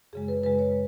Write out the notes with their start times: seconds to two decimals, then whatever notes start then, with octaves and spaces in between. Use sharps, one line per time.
0.13 F#2 C#3 G#3 G#4
0.28 B4
0.43 F#2 C#3 G#3 B4
0.59 C#5